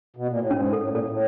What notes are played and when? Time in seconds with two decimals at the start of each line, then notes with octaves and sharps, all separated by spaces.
0.16 B2
0.28 A#2
0.39 A2
0.50 G#2 C#4
0.73 A4
0.80 A2
0.89 A#2
0.95 A2 A4
1.10 A2